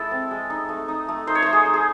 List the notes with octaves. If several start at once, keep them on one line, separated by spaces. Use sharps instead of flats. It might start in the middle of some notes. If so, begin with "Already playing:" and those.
Already playing: G#3 E4 A4
C4
G#3
D#4
A3
D#4
A3
D#4 C5
C#5
A3 C5
G#4
D#4
G#4